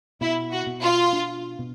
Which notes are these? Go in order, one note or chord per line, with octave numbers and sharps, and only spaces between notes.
B2 E4
F#4
B2
F4
D4
B2